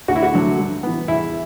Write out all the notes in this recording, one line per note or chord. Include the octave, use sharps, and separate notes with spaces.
D2 F#4
E4
F#4
D3 F#3 A3
G2
E3 B3
E2 E4